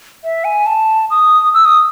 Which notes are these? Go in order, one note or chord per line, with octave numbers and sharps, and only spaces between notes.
E5
G#5
A5
D#6
E6
D#6